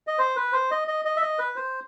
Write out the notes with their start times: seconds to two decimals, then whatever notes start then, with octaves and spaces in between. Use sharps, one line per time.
0.07 D#5
0.18 C5
0.36 B4
0.53 C5
0.71 D#5
0.88 D#5
1.05 D#5
1.16 E5
1.21 D#5
1.39 B4
1.56 C5